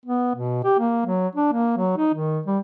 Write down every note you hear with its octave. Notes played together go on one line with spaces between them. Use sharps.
B3
B2
G4
A#3
F#3
D4
A#3
F#3
D#4
D#3
G3